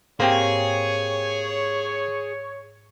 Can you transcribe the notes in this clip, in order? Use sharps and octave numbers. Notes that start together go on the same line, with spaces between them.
G#2 A#3 C4 G4 G#4 C#5